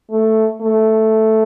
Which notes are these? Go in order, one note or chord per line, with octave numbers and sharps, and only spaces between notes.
A3
A3